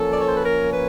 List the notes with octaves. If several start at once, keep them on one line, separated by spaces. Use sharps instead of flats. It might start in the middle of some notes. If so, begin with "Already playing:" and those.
Already playing: F3 A#3 C#4 A4
D5
C#5
C5
B4
A#4
B4